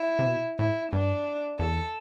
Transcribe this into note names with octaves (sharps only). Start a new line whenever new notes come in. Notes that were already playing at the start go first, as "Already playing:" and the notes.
Already playing: E4
C3
B2
A2 E4
G2 D4
E2 A4